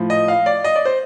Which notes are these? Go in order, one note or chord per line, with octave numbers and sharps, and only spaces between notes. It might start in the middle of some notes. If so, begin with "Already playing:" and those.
Already playing: A2 F3
D#5
F5
D5
D#5
D5
C5